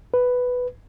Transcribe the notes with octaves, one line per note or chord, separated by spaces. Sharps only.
B4